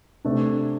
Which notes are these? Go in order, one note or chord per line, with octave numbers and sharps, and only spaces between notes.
C3 A3 D4